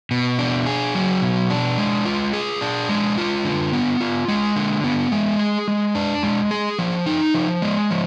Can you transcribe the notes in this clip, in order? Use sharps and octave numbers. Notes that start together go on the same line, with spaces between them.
B2
D4
G#4
F#3
B2
D4
G#3
F4
G#4
D4
G#3
F4
D3
B3
F4
G#3
D3
B3
G#3
G#4
G#3
D4
G#3
G#4
F3
D#4
F3
G#3
F3